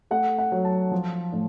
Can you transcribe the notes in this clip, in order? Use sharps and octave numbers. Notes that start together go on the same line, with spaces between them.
A3 F#5
F#5
F#3
A5
F3
A2